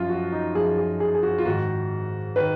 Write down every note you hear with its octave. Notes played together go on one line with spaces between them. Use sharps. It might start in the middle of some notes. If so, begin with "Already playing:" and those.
Already playing: F#2 F3 F4
F#4
D#4
F#2 F3 G#4
G#4
G#4
G#4
F#4
F4
G#2 D#3 F#4
D#3 B4